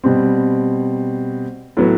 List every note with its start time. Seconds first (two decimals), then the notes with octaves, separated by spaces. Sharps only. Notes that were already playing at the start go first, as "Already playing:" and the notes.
0.04 B2 G3 C4
1.77 A2 F#3 B3